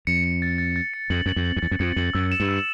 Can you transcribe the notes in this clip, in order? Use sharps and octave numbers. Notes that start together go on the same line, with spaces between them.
F2 C#7
C#7
A6
A6
A6
C#7
F2 F#7
F#2 F#7
F2
F#7
F2
E2 A6
F#2
F2 C#7
F2 F#7
F#2 E6
E7
G2
E6